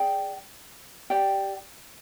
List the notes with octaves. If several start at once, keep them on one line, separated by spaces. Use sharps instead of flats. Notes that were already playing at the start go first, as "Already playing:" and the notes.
Already playing: G#4 D5 G5
G4 D5 G5